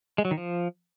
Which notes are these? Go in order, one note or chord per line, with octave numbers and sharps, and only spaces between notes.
G#3
F#3
D#3
F3